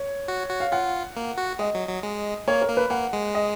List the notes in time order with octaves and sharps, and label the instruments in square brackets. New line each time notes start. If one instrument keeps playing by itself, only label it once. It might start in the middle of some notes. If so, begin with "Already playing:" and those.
Already playing: [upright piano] C#5
[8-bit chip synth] F#4
F#4
[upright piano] F5
[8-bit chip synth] F4 [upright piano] F#5
[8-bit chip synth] A#3
F#4
[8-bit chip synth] G#3 [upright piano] D#5
[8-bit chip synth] F#3
F#3
G#3
[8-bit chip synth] A#3 [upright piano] C#5
[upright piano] A#4
[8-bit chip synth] A#3
[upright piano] B4
[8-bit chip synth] A#3 [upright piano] F#5
[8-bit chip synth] G#3
[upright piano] D#5